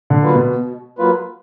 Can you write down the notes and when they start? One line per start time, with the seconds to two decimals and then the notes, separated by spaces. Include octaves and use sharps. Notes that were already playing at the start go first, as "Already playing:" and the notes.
0.10 D3
0.22 F#3 A#3 F4 B4
0.35 B2
0.60 B2
0.98 F#3 A#3 F4 B4